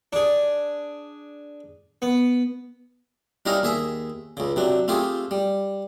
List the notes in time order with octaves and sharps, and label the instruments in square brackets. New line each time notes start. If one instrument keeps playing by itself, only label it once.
[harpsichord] D4 G#4
B3
G3 C#4 D#4 E4 A#4 F5
D#2 G#4 E5 G#5
C#2 C#3
C3 F#3 D4
A3 C4 F4 G4 G#4
G3